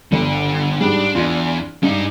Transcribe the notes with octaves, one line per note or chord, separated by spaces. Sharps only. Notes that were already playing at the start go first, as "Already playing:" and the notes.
G1 D3
G#2 G3 D4
E2 D4 F4
G2 G#3 D#4